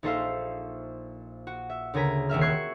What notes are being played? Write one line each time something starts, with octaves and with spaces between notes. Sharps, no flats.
A#1 D#4 A4 C5 E5 F5
F#4
E5
D2 C#3 A#4 G#5 A#5 B6
D#1 C2 E5 F6
C#6 E6 F#6 G#6 C7